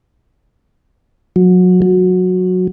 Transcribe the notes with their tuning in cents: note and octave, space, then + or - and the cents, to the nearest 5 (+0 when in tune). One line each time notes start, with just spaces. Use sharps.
F#3 -25
F#3 -15